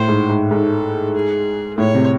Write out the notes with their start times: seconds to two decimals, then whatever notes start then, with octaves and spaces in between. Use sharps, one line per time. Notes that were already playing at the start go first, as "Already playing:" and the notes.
Already playing: A2 C5
0.08 G#2
0.29 G#2
0.51 G#2 A4
1.15 G#4
1.78 A2 C#5
1.95 C3